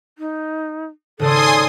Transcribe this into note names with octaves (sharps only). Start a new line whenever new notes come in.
D#4
G#1 C#3 A4 D5 G#5 C6 D#6